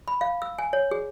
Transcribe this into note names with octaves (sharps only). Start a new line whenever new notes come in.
B5
F5
E6
G#5
C#5
G#4